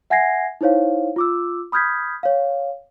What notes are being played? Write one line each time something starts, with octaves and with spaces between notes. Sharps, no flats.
E5 F#5 G#5 G#6 A#6 C7
D#4 E4 C5 C#5 F5
F4 D6 E6
B5 D#6 F6 G6 G#6 B6
C#5 F5